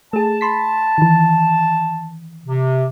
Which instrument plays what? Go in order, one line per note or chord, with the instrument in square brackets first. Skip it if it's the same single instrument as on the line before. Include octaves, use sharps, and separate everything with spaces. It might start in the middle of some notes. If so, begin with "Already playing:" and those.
[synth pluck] A3 G#4 [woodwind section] A5
[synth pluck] B5 C6 B6
D#3 E3
[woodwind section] C3